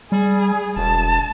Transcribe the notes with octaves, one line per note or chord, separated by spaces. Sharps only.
G3 G#4
E1 A5